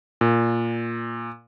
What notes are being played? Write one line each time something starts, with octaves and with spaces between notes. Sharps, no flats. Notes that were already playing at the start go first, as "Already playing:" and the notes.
A#2